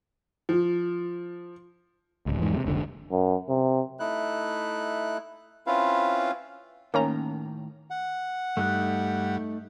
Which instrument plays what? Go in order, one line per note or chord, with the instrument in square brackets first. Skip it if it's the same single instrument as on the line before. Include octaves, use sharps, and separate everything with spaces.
[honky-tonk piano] F3
[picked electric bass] D1 C#2
E2 G#2
C3 G3
F1 C#2 D3
[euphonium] F#2
C3
[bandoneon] A3 D#4 E4 F#6
C4 C#4 E4 F4 B4 F5
[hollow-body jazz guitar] A2 D#3 [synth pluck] A#3 C#4 A#5
[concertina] F#5
[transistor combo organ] G2 G3 [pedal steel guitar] A3 D#4 F#6